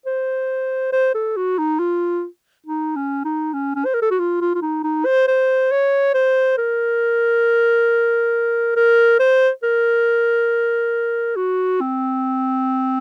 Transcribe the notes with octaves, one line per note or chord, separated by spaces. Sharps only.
C5
C5
A4
F#4
D#4
F4
D#4
C#4
D#4
C#4
C#4
C5
A#4
A4
F#4
F4
F4
F4
D#4
D#4
C5
C5
C#5
C5
A#4
A#4
C5
A#4
F#4
C4